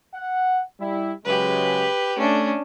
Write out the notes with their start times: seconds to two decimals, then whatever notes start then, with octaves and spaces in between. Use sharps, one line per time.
0.14 F#5
0.80 G3 E4
1.26 C#3 F#3 G#3 G4 B4
2.18 A3 C#4 D4